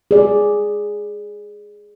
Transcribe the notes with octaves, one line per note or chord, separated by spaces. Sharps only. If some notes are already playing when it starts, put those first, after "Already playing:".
G#4 D5